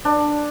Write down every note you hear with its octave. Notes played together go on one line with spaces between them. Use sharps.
D4